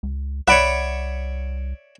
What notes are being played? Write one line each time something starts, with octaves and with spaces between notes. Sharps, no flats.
C#2
C2 C#5 D5 E5 F#5 B5